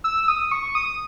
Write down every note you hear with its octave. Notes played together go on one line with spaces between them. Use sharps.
E6
D#6
C#6
D#6